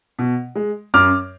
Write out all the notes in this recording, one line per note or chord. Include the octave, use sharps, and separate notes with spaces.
B2
G#3
F#2 D6 F6